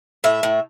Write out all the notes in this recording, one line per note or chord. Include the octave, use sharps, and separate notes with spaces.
A2 E5
A2